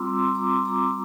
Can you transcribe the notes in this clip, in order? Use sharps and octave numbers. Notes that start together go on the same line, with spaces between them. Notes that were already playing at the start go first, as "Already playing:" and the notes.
Already playing: G3 C4 F4 A#5 C6 D6 E6
A#5 D6
A#5 D6